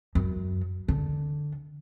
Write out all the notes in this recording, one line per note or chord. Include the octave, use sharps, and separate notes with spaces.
F#2
D3